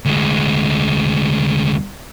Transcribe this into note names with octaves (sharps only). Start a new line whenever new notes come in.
D2 G#3